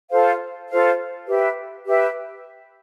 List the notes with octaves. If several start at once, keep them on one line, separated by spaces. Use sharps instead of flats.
F4 A4 C5 F5
F4 A4 C5 F5
G4 B4 E5
G4 B4 E5